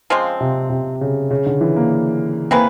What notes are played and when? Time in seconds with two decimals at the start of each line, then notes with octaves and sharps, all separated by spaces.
0.10 C#3 F3 G#3 C4
0.40 C3
0.70 C3
1.01 C#3
1.31 C#3
1.46 D3
1.61 E3
1.76 A#3
2.51 A#3 C4 E4 G#4 B4